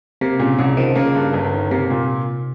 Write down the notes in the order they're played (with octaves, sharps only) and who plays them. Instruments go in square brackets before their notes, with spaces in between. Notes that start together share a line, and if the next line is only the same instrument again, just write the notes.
[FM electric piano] C3 [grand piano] A#3
[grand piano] A#2 [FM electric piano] C#3
[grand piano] C2 [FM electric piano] C#3
[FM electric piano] D#3 [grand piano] F3
[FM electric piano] C#3 [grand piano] A#3
[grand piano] G2
G1
D#3
[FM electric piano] C3 [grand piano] A#3
[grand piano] A#2